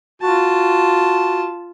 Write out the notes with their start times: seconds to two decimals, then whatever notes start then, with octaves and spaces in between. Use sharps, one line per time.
0.22 F4 F#4 A5